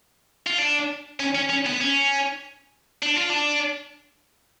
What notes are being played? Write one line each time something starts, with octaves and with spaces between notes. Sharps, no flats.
F4
D4
C#4
C#4
C#4
B3
C#4
D4
F4
D4